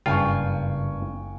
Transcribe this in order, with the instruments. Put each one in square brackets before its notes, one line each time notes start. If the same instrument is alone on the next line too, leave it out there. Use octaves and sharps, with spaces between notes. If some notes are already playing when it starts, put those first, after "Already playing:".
[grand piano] F#1 [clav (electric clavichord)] G2 F4 [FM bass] C#3 [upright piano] G5 G#5 C#6